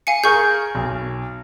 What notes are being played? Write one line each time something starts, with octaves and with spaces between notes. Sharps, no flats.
F5 G#5 C#7
G#4 A#4 C#6 G6
B1